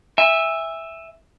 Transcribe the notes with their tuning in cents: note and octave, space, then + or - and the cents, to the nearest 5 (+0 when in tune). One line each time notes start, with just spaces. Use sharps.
E5 +0 G#5 -30